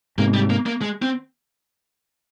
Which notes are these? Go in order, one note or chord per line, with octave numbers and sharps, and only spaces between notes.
G#2 C3 A#3
G3
A#3
A#3
G#3
C4